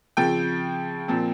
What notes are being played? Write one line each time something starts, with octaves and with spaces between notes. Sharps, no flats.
C#3 F3 C4 G5
A#2 F3 C4